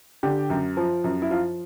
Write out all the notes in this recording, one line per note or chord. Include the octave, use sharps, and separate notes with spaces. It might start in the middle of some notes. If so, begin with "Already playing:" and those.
D3 G4
F#2
F3
F#2
E4
F3 F4